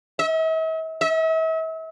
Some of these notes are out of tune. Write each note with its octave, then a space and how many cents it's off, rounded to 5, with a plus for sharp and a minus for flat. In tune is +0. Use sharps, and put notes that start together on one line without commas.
E5 -45
E5 -40